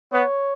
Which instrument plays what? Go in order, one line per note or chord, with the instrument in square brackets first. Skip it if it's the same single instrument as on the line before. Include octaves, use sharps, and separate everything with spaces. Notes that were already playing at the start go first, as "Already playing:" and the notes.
[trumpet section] B3 [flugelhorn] C#5